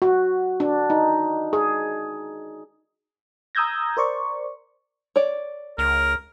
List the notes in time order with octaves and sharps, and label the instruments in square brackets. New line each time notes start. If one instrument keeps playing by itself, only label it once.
[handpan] F#4
D4
D#4
G#4
[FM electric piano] A#5 D#6 E6 G6 G#6 A#6
A#4 C5 D5 C#6
[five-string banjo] C#5 D5
[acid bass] C#2 [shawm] A#4